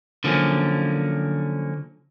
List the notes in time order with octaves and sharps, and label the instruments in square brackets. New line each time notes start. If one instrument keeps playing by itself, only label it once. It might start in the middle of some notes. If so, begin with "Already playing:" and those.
[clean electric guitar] D3 F3 F#3 A#3 C#4